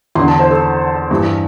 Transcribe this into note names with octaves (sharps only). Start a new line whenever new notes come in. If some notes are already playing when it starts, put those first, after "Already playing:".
E2 D3 C6
A5
C5
A4
G2 E3